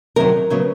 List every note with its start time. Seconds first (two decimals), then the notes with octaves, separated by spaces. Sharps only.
0.16 F2 C3 D#3 F#3 A#4
0.50 C#3 F#3 B3